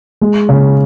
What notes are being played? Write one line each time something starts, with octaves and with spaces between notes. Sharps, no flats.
G#3
C#3